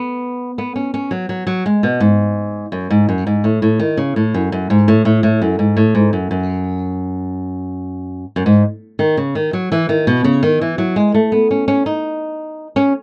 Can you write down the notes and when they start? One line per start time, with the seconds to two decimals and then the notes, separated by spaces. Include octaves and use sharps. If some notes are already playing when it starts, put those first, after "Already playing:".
Already playing: B3
0.58 B3
0.76 C#4
0.94 C#4
1.11 F#3
1.29 F#3
1.47 F#3
1.66 G#3
1.83 B2
2.00 G#2
2.72 F#2
2.90 G#2
3.09 F#2
3.27 G#2
3.44 A2
3.62 A2
3.79 D#3
3.97 C#3
4.16 A2
4.34 F#2
4.52 F#2
4.70 G#2
4.88 A2
5.05 A2
5.23 A2
5.42 F#2
5.59 G#2
5.77 A2
5.95 G#2
6.13 F#2
6.31 F#2
8.36 F#2
8.46 G#2
8.99 D#3
9.17 C#3
9.35 D#3
9.53 F#3
9.72 E3
9.89 D#3
10.07 B2
10.24 C#3
10.43 D#3
10.61 E3
10.78 F#3
10.96 G#3
11.14 A3
11.32 B3
11.51 C#4
11.68 C#4
11.86 D#4
12.76 C#4